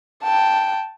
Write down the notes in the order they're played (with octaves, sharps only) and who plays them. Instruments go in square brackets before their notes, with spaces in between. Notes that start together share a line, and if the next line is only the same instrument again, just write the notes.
[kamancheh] G5 A5